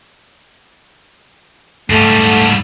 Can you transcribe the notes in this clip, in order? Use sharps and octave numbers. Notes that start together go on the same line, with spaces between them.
G#2 G3 A3